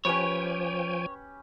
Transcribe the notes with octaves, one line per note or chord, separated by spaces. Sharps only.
F3 C#4 G4 B4 C#5 G5 G#5